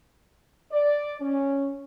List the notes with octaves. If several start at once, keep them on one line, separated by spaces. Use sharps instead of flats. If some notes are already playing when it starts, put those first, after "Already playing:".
D5
C#4